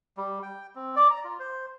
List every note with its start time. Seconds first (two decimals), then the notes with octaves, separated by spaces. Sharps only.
0.17 G3
0.43 G5
0.75 C4
0.96 D5
1.10 A#5
1.24 F4
1.40 C5